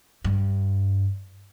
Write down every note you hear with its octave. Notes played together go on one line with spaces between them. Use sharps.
G2